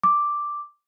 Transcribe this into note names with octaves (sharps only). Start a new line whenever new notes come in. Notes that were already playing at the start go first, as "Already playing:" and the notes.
D6